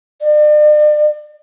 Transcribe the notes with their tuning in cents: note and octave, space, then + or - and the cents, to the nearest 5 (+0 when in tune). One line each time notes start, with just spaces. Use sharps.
D5 +40